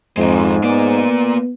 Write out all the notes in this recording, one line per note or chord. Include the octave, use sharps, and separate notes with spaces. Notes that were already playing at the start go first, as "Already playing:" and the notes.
F2 G#2 G#3 C4
A#3 B3 D5